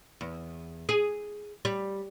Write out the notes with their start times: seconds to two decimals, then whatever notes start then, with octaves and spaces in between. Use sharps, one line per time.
0.21 E2
0.89 G#4
1.65 G3